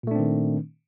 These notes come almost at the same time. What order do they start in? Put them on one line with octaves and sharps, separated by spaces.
A#2 A3 D4 C4 D#3